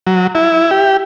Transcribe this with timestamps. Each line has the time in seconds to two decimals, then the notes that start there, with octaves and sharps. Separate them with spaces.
0.07 F#3
0.35 E4
0.71 G4